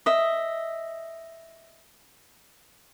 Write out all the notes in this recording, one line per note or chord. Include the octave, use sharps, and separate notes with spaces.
D#5 E5